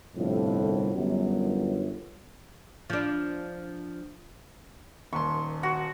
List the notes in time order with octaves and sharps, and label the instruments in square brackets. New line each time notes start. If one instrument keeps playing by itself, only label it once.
[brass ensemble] G1 C2 F2 A2
G1 F#2
[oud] F3 D4
[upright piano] D#1 D#2 C6 [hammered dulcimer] C#6
[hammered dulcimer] F#4